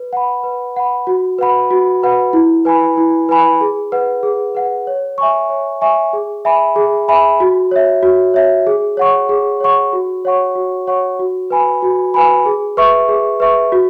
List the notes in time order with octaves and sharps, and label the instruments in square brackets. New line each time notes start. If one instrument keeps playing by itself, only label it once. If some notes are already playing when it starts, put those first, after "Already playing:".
Already playing: [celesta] B4
F#5 B5
B4
F#5 B5
F#4
B4 F#5 B5
F#4
B4 F#5 B5
E4
B4 G#5 B5
E4
B4 G#5 B5
G#4
B4 F#5
G#4
B4 F#5
C#5
E5 G#5 C#6
C#5
E5 G#5 C#6
G#4
E5 G#5 B5
G#4
E5 G#5 B5
F#4
C#5 E5
F#4
C#5 E5
G#4
C#5 F#5 C#6
G#4
C#5 F#5 C#6
F#4
C#5 F#5 C#6
F#4
C#5 F#5 C#6
F#4
B4 G#5 B5
F#4
B4 G#5 B5
G#4
B4 E5 C#6
G#4
B4 E5 C#6
F#4